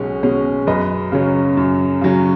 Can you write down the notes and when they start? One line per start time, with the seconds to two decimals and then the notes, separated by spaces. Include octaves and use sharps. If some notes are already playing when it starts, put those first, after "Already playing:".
Already playing: B1 B2 G#3 C#4
0.23 B2 G#3 C#4
0.67 F#2 B4 D#5
1.12 C#3 F#3 C#4
1.57 F#2
2.01 C#3 F#3 C#4